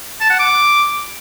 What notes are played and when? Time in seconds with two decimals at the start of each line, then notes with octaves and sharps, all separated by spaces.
0.21 A5
0.30 F#5
0.39 D6